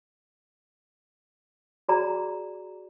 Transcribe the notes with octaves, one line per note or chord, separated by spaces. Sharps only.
F#4 G#4 D5 A#5